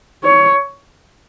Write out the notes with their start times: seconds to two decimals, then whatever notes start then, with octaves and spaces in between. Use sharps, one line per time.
0.24 C#5